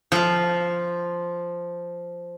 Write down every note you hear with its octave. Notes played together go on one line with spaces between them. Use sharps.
F3 F5